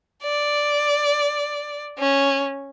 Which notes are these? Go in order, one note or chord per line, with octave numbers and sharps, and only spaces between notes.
D5
C#4